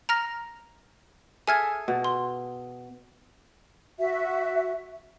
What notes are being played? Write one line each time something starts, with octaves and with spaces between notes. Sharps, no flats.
A#5 F6 A#6
G#4 A4 E5 G#5 F6 G#6
B2
C6
F#4 E5